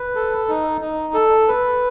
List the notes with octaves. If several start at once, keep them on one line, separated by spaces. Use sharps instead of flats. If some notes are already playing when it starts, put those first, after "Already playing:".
Already playing: B4
A4
D#4
D#4
A4
B4